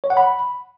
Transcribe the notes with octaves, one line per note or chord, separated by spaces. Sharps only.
C#5
F#5
B5